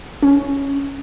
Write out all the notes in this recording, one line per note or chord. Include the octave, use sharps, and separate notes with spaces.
C#4